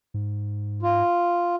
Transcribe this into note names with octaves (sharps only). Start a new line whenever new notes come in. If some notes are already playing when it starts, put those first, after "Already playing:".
G#2
F4